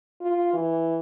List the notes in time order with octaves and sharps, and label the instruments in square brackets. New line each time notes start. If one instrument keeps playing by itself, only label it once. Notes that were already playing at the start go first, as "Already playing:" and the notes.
[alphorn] F4
E3